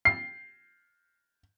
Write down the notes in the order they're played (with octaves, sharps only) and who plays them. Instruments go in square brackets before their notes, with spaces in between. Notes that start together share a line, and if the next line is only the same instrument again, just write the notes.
[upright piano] C7